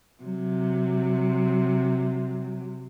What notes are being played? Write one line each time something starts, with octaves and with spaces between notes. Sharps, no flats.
C3 F#3